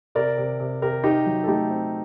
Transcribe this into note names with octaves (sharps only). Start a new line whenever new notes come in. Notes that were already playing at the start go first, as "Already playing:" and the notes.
C3 A#4 D5
C3
C3
C3 G4 A#4
C4 D#4 G4
F#3
A4
A3 D#4 G4
C4